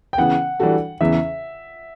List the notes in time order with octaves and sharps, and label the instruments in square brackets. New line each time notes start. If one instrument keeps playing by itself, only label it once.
[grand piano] G5
[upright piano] C#3 E3 B3 [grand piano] F#5
[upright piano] E3 G3 D4 F#4 A4
[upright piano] E2 C#3 E3 [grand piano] E5